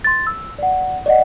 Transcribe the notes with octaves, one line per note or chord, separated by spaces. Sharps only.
C6 A6
E6
D5 F#5
D5 D#5 F#5